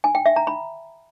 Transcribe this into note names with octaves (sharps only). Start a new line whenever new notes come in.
G#5
G5
E5
A#5
B5